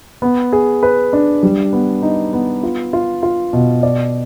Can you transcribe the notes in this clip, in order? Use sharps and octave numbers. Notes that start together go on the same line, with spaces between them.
B3
G#4
B4
D4
G3
B3
D#4
B3
F4
F4
F4
B2
D5